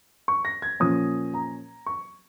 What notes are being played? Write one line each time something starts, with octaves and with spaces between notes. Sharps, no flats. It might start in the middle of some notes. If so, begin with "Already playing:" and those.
C#6
A#6
G#6
A#2 F3 C#4 D#6
A#5
C#6